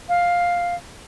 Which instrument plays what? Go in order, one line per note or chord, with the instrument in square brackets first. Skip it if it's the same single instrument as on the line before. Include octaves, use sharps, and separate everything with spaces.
[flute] F5